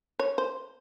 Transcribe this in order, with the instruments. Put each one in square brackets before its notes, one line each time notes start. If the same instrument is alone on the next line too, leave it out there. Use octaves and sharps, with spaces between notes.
[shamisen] C#5
C5